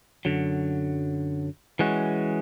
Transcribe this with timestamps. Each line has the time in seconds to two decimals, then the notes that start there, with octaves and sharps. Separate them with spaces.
0.25 F#2 D3 F#3
1.79 E3 G#3 C#4 F#4